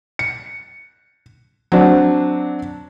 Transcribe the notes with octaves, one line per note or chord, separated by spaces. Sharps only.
C#7
F#3 C4 D4